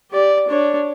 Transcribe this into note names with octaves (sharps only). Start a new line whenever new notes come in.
G4 D5
D4 C#5